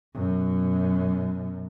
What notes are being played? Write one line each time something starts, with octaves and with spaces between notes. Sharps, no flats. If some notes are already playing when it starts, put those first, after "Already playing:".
F#2 B2